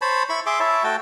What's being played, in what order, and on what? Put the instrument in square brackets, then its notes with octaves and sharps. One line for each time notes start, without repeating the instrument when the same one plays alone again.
[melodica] C5 C#5 A5 B5
E4 B5 C#6
G#4 E5 C6 D6
E4 C#5 E5 A5
A3 F#4 G5 A5